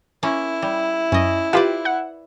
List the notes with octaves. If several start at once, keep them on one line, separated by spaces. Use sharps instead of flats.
A#3 C#4 E4
G3
F#2 C#4 D#5
F4 G4 B4 C5 D5
F#5